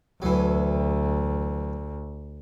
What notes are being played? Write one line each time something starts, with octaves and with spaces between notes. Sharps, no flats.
D2 E3 F#3